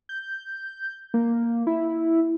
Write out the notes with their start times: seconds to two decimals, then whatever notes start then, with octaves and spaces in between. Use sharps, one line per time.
0.09 G6
1.14 A#3
1.67 E4